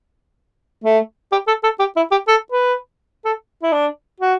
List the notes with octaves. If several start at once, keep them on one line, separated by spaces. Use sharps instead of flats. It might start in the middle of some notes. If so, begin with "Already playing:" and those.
A3
G4
A4
A4
G4
E4
G4
A4
B4
A4
E4
D4
F#4